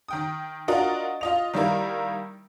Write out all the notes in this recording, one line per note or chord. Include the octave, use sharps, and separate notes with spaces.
D#3 G5 D#6
D4 F4 F#4 A#4 D#5
F4 D#5 F7
D#3 G3 A#3 E4 A#4